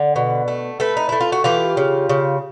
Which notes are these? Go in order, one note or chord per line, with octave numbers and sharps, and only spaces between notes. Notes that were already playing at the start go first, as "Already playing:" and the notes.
Already playing: D3
B2
A3
A3 A4 B4
D#4
A3 E4
F4
F#4
E3 F4 G4
C#3
C#3